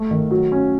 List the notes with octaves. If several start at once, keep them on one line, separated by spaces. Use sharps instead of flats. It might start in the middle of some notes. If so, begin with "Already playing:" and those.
Already playing: A3
D#3
F#3
C#4